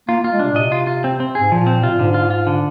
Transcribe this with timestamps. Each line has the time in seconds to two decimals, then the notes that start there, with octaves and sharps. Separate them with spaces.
0.08 A#3 F4
0.20 A#3
0.24 F4
0.32 G#3
0.39 C3 D4
0.52 A#2
0.56 C3 D#5
0.72 F4
0.87 F4
1.04 C4
1.20 C4
1.35 G#2 G#4
1.52 A#2 F3
1.67 C4
1.83 C3 F4
1.91 A#2
1.99 G#2 D3
2.14 F4
2.30 F4
2.47 D3